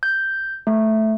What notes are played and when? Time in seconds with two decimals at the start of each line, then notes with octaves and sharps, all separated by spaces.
0.03 G6
0.67 A3